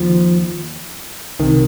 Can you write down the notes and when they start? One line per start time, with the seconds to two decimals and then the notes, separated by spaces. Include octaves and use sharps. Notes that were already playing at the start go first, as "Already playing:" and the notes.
Already playing: D#2 F3
1.39 C2 C3 D#3